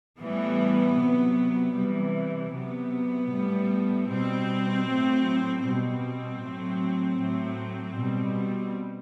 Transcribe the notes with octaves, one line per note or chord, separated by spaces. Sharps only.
A2 E3 G3 B3
C3 F#3
C3 E3 G3
C3 F#3 B3
A2 G3
B2 G3 C4
A2 F#3
B2 G3 C4
A2 F#3
A2 F#3
B2 G3